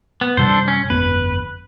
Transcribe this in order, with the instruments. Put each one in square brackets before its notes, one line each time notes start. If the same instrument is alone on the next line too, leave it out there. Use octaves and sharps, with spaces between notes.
[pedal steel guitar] B3
[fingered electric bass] F#2 C3 G3 [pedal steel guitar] D4 A4 C5
[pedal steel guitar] C#4
[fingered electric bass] G1 F2 B3 [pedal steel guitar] B4